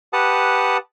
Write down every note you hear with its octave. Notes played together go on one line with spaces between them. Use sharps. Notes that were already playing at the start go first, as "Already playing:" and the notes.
G4 B4 F#5 A5 D#6